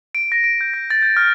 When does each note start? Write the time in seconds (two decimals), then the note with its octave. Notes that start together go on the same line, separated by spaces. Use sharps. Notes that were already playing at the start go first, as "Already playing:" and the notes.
0.15 D7
0.32 A#6
0.44 D7
0.61 G6
0.74 A#6
0.90 A6
1.02 G6
1.17 F6